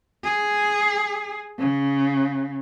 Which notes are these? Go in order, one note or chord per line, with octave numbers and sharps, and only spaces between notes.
G#4
C#3